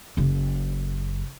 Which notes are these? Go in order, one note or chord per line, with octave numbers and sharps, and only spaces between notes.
F#1 C#3